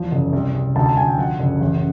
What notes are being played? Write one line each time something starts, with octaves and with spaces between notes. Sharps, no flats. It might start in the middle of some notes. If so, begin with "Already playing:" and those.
Already playing: E2 F3
F#1
C2
C2
D2 A5
A5
D2 G#5
G5
F3 F#5
F#1
A1